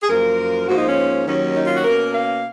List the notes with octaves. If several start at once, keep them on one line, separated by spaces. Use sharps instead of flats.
G#4
F#2 F3 A#3 A#4
G#2 F3 A#3 F#4
D#4
C#4
D#2 D#3 F#3 C#4
D#4
F4
F#4
B2 A#3 C#4 A#4
F5